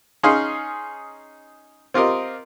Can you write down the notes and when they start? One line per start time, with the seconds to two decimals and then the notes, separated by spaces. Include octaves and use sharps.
0.23 C#4 D#4 G#4 F5 C6
1.94 C4 F4 G4 A#4 D#5